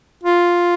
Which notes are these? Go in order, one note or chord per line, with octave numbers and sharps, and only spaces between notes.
F4